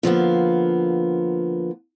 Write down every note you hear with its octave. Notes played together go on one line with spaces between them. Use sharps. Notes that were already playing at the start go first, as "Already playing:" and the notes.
D3 F3 A#3 B3